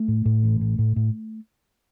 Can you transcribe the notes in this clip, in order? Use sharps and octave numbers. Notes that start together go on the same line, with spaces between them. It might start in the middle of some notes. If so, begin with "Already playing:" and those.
Already playing: A3
A2
A2
A1
A2
A2
A2